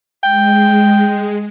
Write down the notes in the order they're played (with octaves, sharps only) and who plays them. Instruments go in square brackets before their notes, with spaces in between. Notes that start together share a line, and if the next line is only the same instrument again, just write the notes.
[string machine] G#3 [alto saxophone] G5